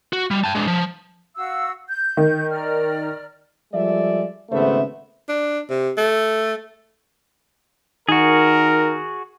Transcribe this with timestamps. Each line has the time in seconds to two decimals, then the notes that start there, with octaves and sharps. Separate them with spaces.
0.13 F#4
0.31 G3
0.44 G5 A5
0.55 G#3 D4
0.67 F3
1.35 F#4 F5 E6
1.89 G6
2.17 D#3
2.51 D5 A#5 F6
3.73 F3 G3 G#3 A4 D5 E5
4.50 G#1 C#3 A3 B3 C5 E5
5.29 D4
5.70 C3
5.97 A3
8.09 D#3 F#4 G#4 A#4